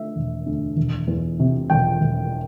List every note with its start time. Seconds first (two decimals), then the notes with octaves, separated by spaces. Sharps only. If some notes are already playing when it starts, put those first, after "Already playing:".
Already playing: D3 A3 E5
0.16 E1
0.46 D2
0.76 E1
1.07 E2
1.40 C3
1.70 E1 G5
2.01 E1